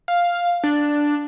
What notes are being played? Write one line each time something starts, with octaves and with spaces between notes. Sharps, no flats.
F5
D4